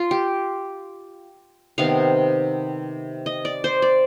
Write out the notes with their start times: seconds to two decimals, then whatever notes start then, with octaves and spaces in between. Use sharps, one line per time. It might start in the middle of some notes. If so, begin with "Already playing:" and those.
Already playing: F4
0.11 G4
1.78 C3 D#3 B3 F5
3.26 D#5
3.45 D5
3.64 C5
3.82 D5